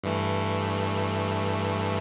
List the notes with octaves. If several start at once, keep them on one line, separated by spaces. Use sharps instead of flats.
G2 E3 A3